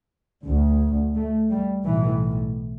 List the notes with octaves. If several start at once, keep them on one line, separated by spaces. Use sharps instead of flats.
D2
A3
G3
B1 A2 E3